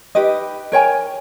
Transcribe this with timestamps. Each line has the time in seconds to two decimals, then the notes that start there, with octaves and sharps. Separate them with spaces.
0.15 D#4 G4 B4 D#5
0.72 A#4 C#5 G5 G#5